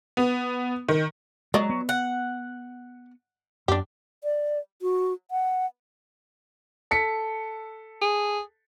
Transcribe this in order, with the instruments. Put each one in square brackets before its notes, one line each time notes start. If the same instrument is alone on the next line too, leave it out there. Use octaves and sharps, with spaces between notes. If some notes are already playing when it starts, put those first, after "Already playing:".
[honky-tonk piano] B3
D#3
[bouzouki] F#3 [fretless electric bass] G#3 [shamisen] D5 D#5
[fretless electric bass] B3
[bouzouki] F#5
[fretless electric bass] F#2 [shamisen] D4 G4
[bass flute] D5
F#4
F#5
[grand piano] A4 B6 C#7
[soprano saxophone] G#4